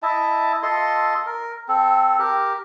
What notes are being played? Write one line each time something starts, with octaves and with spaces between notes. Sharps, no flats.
E4 D#5 E5 A5
F4 A4 D#5 C6
A#4
C4 A4
G4 A#4